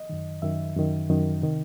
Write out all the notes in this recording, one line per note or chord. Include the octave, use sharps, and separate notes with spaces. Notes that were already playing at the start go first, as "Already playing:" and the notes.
Already playing: D#5
F#2 D#3
F#2 D#3 E5
F#2 D#3
F#2 D#3
C3 D#3